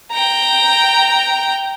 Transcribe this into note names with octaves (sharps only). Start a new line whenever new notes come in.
G5 A#5